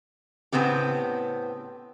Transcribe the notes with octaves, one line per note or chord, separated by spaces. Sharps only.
A2 C#3 A3 B3 C4 G4